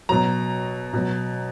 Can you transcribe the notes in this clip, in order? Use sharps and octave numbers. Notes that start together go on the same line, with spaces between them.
B2 F#3 A#5
B2 F#3